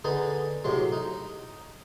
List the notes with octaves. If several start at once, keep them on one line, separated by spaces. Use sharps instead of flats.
D3 B3 D#4 G#4 G#5
A2 C3 F#3 G#3
D#4